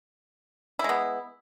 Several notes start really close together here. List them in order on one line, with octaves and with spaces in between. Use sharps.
E4 G#3 B3